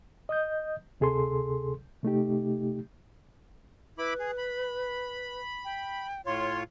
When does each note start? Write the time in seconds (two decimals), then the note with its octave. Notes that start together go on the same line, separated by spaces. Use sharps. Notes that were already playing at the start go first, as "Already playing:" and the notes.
0.29 D#5 D#6 G6
1.00 D2 C3 G#4 A4 C6
2.03 C3 A3 D#4 G4
3.98 E4 B4 B5 D6
4.19 G#4
4.38 B5
5.65 G5
6.26 A2 F4 C#5 C6